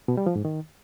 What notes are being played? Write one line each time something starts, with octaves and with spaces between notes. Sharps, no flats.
B2
G3
F3
G#2
D#3